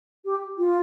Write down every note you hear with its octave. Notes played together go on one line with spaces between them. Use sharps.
G4
F4